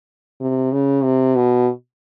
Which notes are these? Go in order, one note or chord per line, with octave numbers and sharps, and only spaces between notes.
C3
C#3
C3
B2